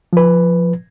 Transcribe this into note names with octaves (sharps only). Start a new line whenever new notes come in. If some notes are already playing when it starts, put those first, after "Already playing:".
F3 B4